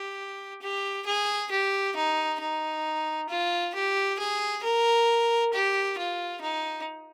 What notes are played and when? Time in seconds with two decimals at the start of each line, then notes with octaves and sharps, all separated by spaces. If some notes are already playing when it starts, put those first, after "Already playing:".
Already playing: G4
0.62 G4
1.06 G#4
1.51 G4
1.96 D#4
2.40 D#4
3.29 F4
3.75 G4
4.19 G#4
4.63 A#4
5.53 G4
5.98 F4
6.42 D#4